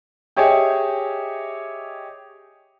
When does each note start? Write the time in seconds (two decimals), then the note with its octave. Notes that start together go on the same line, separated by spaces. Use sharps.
0.36 G4 G#4 C#5 D#5 E5 G#5